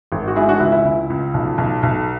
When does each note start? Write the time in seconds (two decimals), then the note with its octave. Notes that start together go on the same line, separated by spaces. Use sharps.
0.12 G#1
0.28 F#4
0.36 G#3 E4 G#4
0.48 D4 F#4
0.60 C#2 E4
0.72 E4
0.84 C#2 E4
1.10 C#2
1.34 B1
1.58 B1
1.83 B1